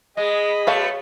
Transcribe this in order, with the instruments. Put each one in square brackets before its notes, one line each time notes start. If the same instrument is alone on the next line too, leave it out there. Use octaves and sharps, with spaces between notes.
[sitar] G#3 [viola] G#4 B5 [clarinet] D#5
[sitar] B2 A3 [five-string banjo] C#5 F5 A5